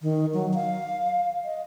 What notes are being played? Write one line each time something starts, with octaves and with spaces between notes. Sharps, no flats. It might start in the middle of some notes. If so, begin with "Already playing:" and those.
D#3
F#3
F5
D#5